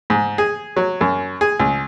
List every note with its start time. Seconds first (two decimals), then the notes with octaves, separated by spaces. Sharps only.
0.10 G#2
0.38 G#4
0.76 F#3
1.01 F#2
1.41 G#4
1.60 C#2